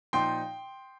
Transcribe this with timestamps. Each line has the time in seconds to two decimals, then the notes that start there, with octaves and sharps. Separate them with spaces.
0.13 A#2 F3 D#4 G5 C6